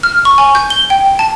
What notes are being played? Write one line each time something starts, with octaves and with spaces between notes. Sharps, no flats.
F6
C#6
G#5
G6
G7
G5
A5